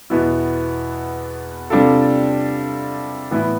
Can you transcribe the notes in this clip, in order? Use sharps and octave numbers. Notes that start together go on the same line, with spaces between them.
E2 B2 B3 E4
C3 G3 D4 F4 A4
A2 E3 B3 E4